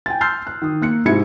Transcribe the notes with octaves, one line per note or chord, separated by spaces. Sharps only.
G5 G#5 A6
C6 E6 F6 G6 A6 C7
F#6
D#3 D#6
A#3 F#6 C#7
G#2 C3 E4 G#6 C#7